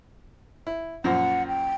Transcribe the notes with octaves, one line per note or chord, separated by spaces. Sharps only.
E4
F#2 A#2 F3 F#5
G5